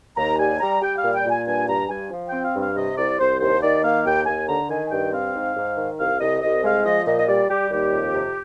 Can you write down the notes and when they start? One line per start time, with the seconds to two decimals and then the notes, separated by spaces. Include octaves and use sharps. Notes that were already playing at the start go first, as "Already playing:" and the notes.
0.17 D#2 A#5
0.38 G3 G#5
0.60 G3 A#5
0.81 G3 G5
0.97 F5
1.03 A#2
1.14 G5
1.25 A#2
1.30 G#5
1.46 G2 G#5
1.68 G2 A#5
1.89 G2 G#5
2.11 F3
2.27 G5
2.32 C4
2.43 F5
2.54 G2
2.60 F5
2.76 C3 D#5
2.97 C2 D5
3.19 C2 C5
3.41 D#2 C5
3.62 D#3 D5
3.84 A#3 F5
4.05 D#2 G5
4.26 D#2 G#5
4.48 D3 A#5
4.70 D#3 G#5
4.88 G#5
4.91 G2 G5
5.13 C4 F5
5.34 G#2
5.56 G#2
5.77 D#3
5.98 C2 F5
6.21 C2 D#5
6.42 C2 D#5
6.64 G#3 F5
6.85 F3 D#5
7.06 A#2 D#5
7.20 D#5
7.28 G3 D5
7.50 G3 G4
7.71 D#2 G4
7.93 F2
8.14 C3